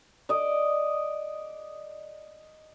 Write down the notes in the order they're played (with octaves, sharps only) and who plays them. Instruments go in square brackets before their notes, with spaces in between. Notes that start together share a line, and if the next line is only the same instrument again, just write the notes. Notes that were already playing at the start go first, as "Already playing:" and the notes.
[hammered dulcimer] D5 D#5